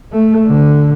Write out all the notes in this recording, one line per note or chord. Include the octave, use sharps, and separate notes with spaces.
A3
D3